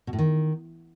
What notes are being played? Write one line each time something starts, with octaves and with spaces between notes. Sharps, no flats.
B2
A2
D#3